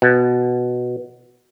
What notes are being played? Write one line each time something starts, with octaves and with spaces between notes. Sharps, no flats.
B2